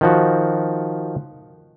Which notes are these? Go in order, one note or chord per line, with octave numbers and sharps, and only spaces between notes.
D#3 F3 F#4